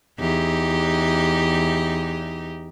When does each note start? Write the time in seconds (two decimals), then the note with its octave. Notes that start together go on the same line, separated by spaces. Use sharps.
0.19 E2 D#4 G4